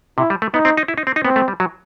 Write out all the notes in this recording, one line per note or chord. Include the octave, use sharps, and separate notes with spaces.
C3 E4
G3
A3
B3 D#4
C4
D#4
E4
D#4
C4
D#4
B3 C4
A3
G3
F#3